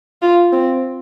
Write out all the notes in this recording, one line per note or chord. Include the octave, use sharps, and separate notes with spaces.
F4
C4